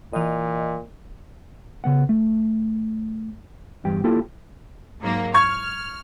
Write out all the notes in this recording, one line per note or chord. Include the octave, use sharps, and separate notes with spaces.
A#2 E3 D#5
C#3 B3 F#5
A3
E2 G2 G4 G5
A#3 E4 F4 G4 A4 A5
G#2 F#3 A#3
C#6 F6 G#6